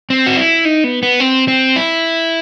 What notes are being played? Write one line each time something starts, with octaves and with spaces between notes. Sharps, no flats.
C4
F#4
E4
D#4
B3
B3
C4
C4
E4